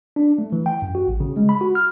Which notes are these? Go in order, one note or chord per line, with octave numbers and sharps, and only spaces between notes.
D4
A3
E3
G5
F#2
F#4
A1
C#3
G#3
B5
F#4
F6